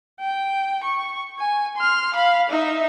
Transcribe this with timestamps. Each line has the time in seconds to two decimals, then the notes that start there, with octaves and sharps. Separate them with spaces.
0.20 G5
0.84 C#6
1.39 G#5
1.77 C6 F6
2.14 F5 B5
2.50 D#4 E5